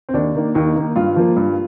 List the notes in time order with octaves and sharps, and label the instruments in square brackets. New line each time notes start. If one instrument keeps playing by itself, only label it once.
[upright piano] C4
D#2 D4
D#3 A#3
D#2 D#4
D#3 A#3
G2 F4
F3 A#3
G2